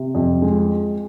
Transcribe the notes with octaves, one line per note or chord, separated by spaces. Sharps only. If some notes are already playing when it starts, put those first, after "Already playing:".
Already playing: C3
F2
G#3